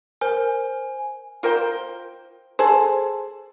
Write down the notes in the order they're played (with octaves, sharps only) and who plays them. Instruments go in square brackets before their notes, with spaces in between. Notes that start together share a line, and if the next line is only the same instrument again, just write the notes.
[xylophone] A#4 C5 [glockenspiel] G#5
[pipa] F4 A#4 C5 G5
G#4 A4 C5